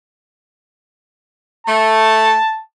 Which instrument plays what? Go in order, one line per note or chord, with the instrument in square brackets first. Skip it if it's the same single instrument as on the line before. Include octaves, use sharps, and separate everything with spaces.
[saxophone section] A3 [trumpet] A5